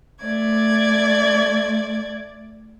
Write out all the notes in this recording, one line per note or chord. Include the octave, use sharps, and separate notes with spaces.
A3 D5 G#6